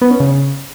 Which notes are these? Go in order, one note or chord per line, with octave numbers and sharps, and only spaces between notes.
B3
C#4
C#3